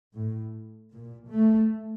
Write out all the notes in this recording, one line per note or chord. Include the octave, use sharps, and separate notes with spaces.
A2
A#2
A3